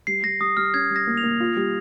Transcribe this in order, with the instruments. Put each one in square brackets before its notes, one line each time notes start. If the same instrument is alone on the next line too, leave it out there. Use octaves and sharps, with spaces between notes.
[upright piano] G3 [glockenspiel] C7
[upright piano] G3 [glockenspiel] A#6
[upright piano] G3 [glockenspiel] D#6
[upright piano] G3 [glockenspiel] F6
[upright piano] C#4 [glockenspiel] G#6
[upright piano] G3
[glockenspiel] A#6
[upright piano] A#3
[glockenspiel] F7
[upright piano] A#3
F4
G3